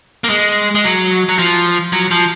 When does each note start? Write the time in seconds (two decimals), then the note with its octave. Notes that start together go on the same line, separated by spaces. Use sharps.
0.24 A#3
0.30 G#3
0.75 G#3
0.84 F#3
1.29 F#3
1.39 F3
1.93 F#3
2.11 F3